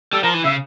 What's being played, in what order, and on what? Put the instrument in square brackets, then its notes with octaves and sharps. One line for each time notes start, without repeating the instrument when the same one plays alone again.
[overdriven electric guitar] G3 [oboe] A4
[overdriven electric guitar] F3 [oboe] A#4
[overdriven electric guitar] E3
[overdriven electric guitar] C#3 [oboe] E5